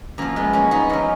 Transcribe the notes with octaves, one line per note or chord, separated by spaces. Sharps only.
F#2 F3 A#3
G#3 B3
A#3 C#4
B3 D#4
F#2 F3 A#3 C#4